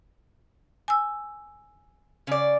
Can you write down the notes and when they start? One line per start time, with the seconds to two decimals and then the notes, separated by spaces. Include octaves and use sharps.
0.88 G#5 E6
2.27 C#3 D5